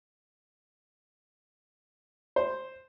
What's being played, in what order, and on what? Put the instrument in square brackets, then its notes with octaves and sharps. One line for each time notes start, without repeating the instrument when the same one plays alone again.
[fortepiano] C5